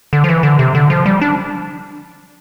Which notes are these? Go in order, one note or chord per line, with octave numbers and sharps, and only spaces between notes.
D3
F3
E3
D3
C3
D3
F3
G3
D4